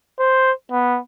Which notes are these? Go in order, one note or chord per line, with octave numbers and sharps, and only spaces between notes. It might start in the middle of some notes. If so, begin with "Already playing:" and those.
C5
B3